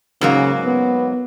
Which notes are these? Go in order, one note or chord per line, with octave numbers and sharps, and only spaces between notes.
G#2 C#3 F#3 A#3
B3